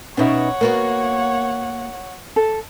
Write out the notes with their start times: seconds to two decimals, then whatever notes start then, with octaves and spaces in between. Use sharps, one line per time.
0.17 B2 B3 C#4 D#4 C#5 E5 F#5
0.61 A#3 B3 F#4 A#4
2.36 A4